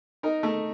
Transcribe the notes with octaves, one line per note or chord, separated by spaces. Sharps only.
D#4 A#4
A3